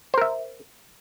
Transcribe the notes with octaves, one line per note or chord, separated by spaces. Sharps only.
A#4 C5 E5